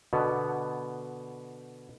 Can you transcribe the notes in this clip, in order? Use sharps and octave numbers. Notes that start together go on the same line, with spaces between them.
B2 D3 B3